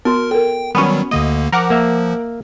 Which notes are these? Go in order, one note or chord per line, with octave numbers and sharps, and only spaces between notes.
B3 F#4 A#4 C6
A4 A#4 G5
D#3 F#3 G3 B3 C#4 F#4 G#5 B5
D2 D3 A#3 D#5
F3 A#4 F#5 D6
A#3 E5